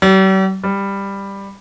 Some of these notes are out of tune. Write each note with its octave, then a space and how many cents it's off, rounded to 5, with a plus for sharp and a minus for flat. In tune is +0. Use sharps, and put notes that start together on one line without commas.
G3 -45
G3 +10